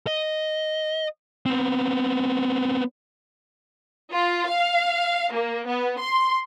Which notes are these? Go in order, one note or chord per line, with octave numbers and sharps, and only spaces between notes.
D#5
B3 C4
F4
F5
A#3
B3
C6